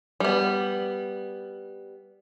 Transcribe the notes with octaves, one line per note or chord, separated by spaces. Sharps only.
G3 B3